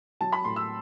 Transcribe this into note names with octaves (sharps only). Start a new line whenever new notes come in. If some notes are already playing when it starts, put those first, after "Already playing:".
F#3 A5
B5
A2 C6
E6